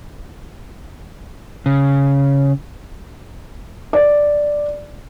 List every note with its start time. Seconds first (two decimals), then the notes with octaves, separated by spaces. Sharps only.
1.66 C#3
3.93 D5